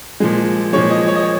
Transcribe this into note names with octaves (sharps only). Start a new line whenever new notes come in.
A#2 F3 G#3
A#2 F3 G#3 C#5
D#5
C#5
D#5
C#5